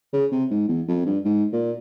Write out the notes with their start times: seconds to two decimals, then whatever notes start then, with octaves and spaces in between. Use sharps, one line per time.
0.13 C#3
0.31 C3
0.50 G#2
0.68 E2
0.88 F2
1.06 G2
1.25 G#2
1.53 A#2